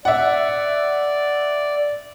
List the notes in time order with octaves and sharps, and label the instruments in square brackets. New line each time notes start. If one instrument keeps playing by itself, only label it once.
[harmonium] D5 [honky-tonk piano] E5 F#5